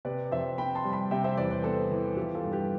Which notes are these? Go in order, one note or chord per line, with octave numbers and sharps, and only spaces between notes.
C3 B4 D5
F2 C5 E5
C4 G5 B5
A5 C6
G3
G5 B5
C3 E5 G5
C5 E5
E2 B4 D5
B4 D5
B3 A4 C5
E3
F3 G4 B4
F4 A4
G2
G4 B4